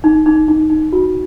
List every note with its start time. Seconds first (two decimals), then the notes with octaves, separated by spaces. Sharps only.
0.04 D#4
0.26 D#4
0.48 D#4
0.70 D#4
0.93 F#4